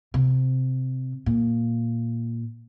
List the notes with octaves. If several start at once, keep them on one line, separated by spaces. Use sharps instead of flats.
C3
A#2